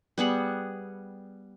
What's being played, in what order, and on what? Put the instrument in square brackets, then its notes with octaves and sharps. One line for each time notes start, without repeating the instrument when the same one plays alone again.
[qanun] G3 B3 G#4 F#5